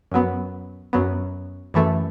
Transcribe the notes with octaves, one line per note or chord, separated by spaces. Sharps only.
F#2 F#3 B3
F#2 F#3 B3
F#2 E3 A3